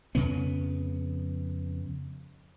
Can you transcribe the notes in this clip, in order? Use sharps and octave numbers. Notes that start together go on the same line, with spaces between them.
F2 C#3 B3